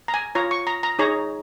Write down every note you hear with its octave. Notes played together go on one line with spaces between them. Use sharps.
A#5
G#5
F4 C#5 A#5
C#6
A#5
A#5
D#4 G#4 C#5 A#5